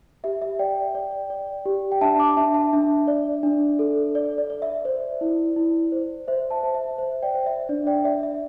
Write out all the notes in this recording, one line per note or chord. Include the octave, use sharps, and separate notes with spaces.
G4 E5
E5
D5 G5
D5
D5
G4
G5
D4 E5 A5
A5 D6
D4 E5 A5
E5 A5
D4 E5
D5
D4
A4
D5
D5
D5
E5
C5 D5
E4
E4
C5
C5 E5
E5 A5
C5
E5
C5 E5
D5 G5
C5
E5
D4 D5
D5 G5
D5 E5
E5